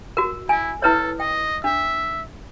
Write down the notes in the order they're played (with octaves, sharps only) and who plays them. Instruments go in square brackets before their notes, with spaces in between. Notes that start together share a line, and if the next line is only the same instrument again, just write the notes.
[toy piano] F#4 A#4
[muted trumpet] E4 [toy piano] G#5
[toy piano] E4 B4 C#5 [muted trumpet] A4
[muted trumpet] D#5 [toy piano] G5
[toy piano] D4 [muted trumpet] E5